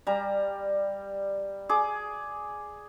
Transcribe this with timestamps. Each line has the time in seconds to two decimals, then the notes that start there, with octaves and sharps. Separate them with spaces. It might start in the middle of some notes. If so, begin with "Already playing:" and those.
0.07 G3 A#5
1.69 G#4 D6